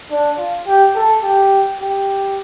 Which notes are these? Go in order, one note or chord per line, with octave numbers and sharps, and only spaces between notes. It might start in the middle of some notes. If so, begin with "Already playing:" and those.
D4
F4
G4
A4
G4
G4